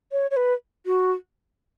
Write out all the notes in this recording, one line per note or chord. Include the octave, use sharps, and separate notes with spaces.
C#5
C#5
B4
F#4